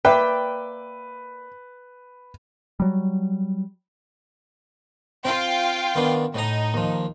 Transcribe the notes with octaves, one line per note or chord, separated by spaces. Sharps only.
A#3 B4 D5 E5 G5
F#3 G3
C4 F4 F5 G5
D#3 B3 D4
A2 D#4 A#5
D#2 F3